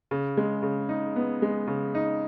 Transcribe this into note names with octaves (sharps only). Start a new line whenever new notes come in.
C#3
G#3
C#3
D#4
B3
G#3
C#3
D#4